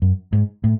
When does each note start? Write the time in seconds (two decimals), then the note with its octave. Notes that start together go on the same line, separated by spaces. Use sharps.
0.02 F#2
0.33 G#2
0.64 A2